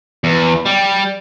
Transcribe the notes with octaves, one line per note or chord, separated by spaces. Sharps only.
E2
G3